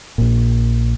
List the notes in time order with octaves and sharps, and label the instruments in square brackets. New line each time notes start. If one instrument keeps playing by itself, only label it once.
[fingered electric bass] A#1 A#2